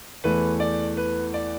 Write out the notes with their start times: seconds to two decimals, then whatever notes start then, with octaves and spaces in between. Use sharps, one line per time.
0.24 E2 E3 A3 B4
0.60 D5
0.97 B4
1.34 D5